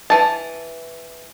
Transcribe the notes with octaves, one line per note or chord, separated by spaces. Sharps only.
E3 A5